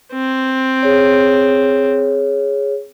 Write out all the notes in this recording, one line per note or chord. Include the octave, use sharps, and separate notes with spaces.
C4
G#4 C#5